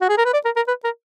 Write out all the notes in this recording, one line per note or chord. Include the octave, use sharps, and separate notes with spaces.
F#4
G#4
A#4
B4
D5
A#4
A#4
B4
A#4